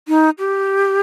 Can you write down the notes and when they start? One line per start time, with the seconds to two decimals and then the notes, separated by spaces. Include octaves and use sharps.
0.08 D#4
0.39 G4